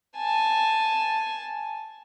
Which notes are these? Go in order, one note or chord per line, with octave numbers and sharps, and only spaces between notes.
G#5 A5